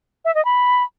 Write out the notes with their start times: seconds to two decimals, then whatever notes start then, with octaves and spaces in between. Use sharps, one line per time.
0.25 E5
0.35 D#5
0.45 B5